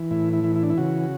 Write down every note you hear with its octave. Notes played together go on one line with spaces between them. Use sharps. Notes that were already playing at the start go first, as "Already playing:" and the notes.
Already playing: E3
A2 E4
E4
E3
E4
D4
E4
C#3 F#4